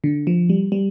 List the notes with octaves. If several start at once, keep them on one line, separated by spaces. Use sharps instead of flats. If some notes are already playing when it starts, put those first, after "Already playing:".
D3
F3
G3
G3